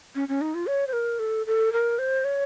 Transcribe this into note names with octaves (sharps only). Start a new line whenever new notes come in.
C#4
C#4
D#4
F4
C#5
C5
A#4
A4
A4
A#4
C5
C#5